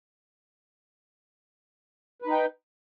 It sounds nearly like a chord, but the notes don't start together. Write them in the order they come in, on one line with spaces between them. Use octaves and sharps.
B4 D#4 G5